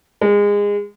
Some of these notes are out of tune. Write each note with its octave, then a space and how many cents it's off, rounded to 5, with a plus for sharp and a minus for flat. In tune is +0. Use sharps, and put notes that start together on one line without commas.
G#3 -25